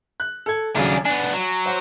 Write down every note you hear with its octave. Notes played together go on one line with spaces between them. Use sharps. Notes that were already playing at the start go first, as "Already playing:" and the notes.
F#6
A4 G#6
D#1 C#3 F#3 D4 G#4
B3 D4 G#5
F#3
C5 F#5